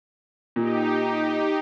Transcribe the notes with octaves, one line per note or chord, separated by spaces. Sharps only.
A#2 D#4 G4